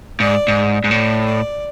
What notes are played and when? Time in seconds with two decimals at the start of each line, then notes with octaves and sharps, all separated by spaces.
0.20 G#2 D5
0.48 G#2
0.84 G#2
0.91 A2 D5
1.25 D5